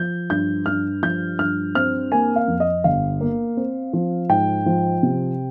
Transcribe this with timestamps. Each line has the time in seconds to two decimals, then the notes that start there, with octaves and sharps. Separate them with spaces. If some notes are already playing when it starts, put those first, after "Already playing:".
Already playing: F3 G6
0.30 G2 G6
0.66 G2 F6
1.02 F3 G6
1.39 G2 F6
1.75 C4 F6
2.12 A#3 G#5
2.36 F5
2.48 F2
2.60 D#5
2.84 G1 F5
3.21 A#3
3.57 C4
3.93 F3
4.29 G#2 G5
4.66 F3
5.03 C3